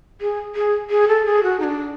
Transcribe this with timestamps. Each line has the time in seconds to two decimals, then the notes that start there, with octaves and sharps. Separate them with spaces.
0.21 G#4
0.56 G#4
0.90 G#4
1.08 A4
1.26 G#4
1.43 F#4
1.60 D#4
1.64 D4